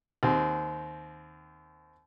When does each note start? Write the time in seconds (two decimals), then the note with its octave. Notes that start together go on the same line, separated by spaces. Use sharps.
0.23 D#2 C4